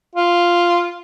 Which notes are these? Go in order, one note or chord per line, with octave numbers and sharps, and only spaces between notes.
F4